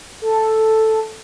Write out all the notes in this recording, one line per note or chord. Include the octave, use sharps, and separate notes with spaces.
A4